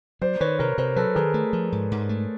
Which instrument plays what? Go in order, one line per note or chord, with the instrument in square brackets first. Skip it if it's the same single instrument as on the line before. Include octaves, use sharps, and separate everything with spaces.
[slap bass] F#3 [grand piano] C5 D5
[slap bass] D#3 [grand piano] B4 C#5
[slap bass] C3 [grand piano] A#4 C5
[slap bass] C3 [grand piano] A#4 C5
[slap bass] F#3 [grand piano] A4 B4
[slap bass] D#3 [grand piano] G#4 A#4
[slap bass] A3
F3
G#2
G#2
A3